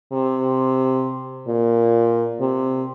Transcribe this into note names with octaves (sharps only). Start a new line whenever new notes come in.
C3
A#2
C3